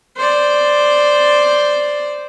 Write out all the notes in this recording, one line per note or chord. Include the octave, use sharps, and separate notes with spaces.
C5 D5